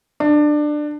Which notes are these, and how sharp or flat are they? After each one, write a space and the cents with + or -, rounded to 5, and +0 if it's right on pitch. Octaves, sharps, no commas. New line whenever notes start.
D4 +20